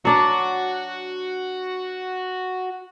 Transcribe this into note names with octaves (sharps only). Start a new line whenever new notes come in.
F#3 D4 F#4 D5